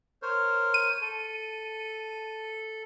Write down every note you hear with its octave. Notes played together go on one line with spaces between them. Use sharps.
A#4 C5 C#5
D#7
A4